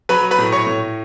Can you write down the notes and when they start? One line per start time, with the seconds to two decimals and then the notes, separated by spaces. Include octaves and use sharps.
0.09 F#3 B4 B5
0.31 B4 B5
0.38 A2
0.52 C#5 C#6
0.67 A2